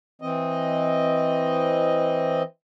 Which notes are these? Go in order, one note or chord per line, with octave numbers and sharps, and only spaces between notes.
E3 C4 D#5